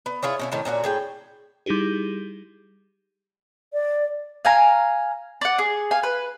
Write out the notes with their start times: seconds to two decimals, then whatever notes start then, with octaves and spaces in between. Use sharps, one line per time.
0.06 B3
0.22 E4 F4 G#4 C#5
0.39 B2 C#4 E4
0.52 A2 D#3 C4 C#4
0.65 A#2 C#4 D4 F#4
0.84 A2 G#4 G5
1.66 G3 D#4 E4 G4 G#4
3.73 D5
4.45 F5 G#5 A#5
5.41 D5 F#5
5.59 G#4
5.91 F5 G#5
6.03 B4